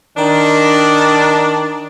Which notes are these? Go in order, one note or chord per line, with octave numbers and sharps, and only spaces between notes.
D#3 D4